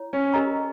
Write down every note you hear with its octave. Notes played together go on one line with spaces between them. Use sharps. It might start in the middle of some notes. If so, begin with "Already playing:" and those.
Already playing: E4 C#5
C#4
G4 A#4 D#5 A#5 C#6